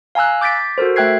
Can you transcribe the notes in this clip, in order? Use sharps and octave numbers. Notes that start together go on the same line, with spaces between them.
F5 G#5 A#5 E6 F#6
D6 G6 A6 B6 D7
F#4 A4 A#4 C5
A3 E5 G5 F#6 G#6 C7